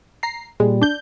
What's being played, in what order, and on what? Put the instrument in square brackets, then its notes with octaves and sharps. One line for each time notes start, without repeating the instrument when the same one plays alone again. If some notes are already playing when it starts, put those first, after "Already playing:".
[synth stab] A#5 C7
[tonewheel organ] A#2 G3 [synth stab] G#3
[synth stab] D4 G6